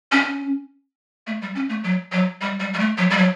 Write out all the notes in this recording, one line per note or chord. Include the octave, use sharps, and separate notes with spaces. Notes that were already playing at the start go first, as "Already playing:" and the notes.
C#4
A3
G3
C#4
A3
F#3
F#3
G3
G3
G3
A3
F#3
G3
F#3